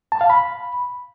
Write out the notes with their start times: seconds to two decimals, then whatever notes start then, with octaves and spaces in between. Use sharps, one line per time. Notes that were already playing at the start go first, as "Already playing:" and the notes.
0.12 A5
0.21 F5
0.30 B5